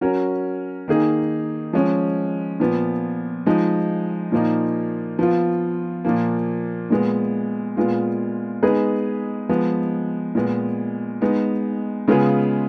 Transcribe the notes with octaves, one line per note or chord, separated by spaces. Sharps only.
F#3 C#4 F#4 A#4
D#3 A#3 D#4 G#4
F3 G#3 C#4
A#2 F3 B3
F3 G#3 D#4
A#2 F3 A#3 D#4
F3 B3 F4
A#2 F3 A#3
A#2 G#3 B3
A#2 G#3 B3 F4
G#3 B3 D#4 G#4 B4
F3 G#3 B3
A#2 G#3 B3
G#3 B3 D#4
C#3 G#3 B3 F4 G#4